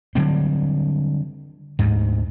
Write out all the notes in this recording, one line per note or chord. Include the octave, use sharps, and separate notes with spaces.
D3 F#3 G3 C4
D2 G#2